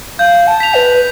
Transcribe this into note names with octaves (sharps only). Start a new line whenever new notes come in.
F5 G6
A5
B6 F7
B4